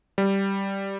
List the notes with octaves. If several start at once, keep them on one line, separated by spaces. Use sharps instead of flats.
G3